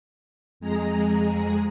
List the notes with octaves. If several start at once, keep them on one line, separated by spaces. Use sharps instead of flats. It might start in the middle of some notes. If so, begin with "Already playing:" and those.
F2 G#3 G#4 A#5